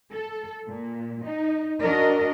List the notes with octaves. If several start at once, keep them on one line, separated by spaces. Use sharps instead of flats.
A4
A#2
D#4
D4 F#4 A#4 D#5